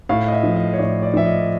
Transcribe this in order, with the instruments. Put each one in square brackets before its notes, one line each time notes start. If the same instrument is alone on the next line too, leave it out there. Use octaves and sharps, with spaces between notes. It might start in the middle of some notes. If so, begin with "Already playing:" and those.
[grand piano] A2 F5
D#5
E5
F3
D#5
C#5
A2 D5
D5
F3 E5
D#5